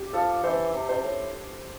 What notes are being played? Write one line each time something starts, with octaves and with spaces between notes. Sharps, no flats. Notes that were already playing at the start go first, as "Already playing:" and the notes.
Already playing: G4
F3 A4
E3 C5
C3
C5
A2